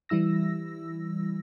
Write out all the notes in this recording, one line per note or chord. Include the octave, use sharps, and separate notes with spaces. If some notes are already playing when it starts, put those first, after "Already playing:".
E3 G3 E4 E6 A#6